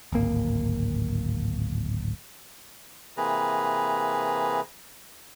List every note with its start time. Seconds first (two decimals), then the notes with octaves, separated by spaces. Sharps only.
0.12 D1 G#1 A#3
3.17 C3 E3 A#3 G#4 B4 A#5